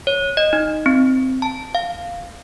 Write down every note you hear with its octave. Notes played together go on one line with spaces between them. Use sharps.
C#5
D#5
D#4
C4
A5
F5